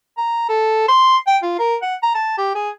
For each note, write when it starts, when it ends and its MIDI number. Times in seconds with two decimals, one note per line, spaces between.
0.18 0.48 82
0.49 0.87 69
0.88 1.16 84
1.27 1.37 79
1.43 1.57 65
1.59 1.76 70
1.82 1.95 78
2.03 2.10 82
2.15 2.34 81
2.38 2.51 67
2.55 2.70 68